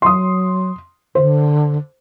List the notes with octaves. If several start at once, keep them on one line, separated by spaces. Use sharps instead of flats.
F#3 C6 D#6
D3 C5